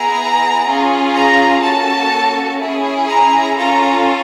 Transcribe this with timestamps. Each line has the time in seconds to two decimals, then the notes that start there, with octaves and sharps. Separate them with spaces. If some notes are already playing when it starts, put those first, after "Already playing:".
Already playing: B3 E4 G#4 A#5
0.67 C#4 F4 G#4
1.16 A#5
1.63 A#3 C#4 F#4 A4 A5
2.61 C#4 E4 G#4
3.09 A#5
3.57 C#4 F4 A4 A#5